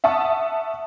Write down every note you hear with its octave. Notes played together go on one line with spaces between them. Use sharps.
E5 F#5 A5 C#6 D#6